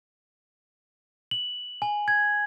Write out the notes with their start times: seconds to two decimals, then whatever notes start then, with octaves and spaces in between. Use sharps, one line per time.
1.31 F#7
1.82 G#5
2.08 G#6